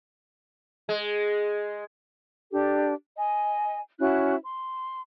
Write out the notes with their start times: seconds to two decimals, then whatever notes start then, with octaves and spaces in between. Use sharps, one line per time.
0.89 G#3
2.51 D4 G4 A4
3.18 D#5 G#5
3.99 C#4 E4 F#4 F#6
4.44 C6